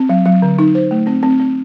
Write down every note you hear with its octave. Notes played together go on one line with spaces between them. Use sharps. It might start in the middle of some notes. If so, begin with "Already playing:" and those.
Already playing: C4
F#3
F#3
D3
D#4
C5
A3
C4
C4
C4